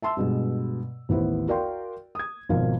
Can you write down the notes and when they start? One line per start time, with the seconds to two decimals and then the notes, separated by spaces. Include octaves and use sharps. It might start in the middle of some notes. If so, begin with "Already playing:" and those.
0.02 E5 A5 C6 E6
0.17 G2 B2 G#3
1.09 A1 D#2 B3 E4 C5
1.48 F#4 A#4 D5 F5 G5 C6
2.15 D#6 G#6
2.49 G#1 G#2 B2 F3 A#4 F5